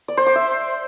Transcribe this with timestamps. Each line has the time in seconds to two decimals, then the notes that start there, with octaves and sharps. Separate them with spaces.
0.08 D5
0.17 C5
0.26 D6
0.36 E5